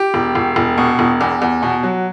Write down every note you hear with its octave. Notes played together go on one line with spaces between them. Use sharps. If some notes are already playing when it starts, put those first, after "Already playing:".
Already playing: G4
E1
E1
E1
B2
E1
E2
E2
B2
F#3